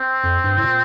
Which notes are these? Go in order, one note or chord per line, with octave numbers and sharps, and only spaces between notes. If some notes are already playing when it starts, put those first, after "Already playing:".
Already playing: C4
F2
G2
A2
A#2